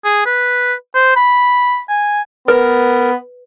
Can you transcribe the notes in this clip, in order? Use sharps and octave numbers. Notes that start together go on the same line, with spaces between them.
G#4
B4
C5
B5
G#5
B3 A#4 B4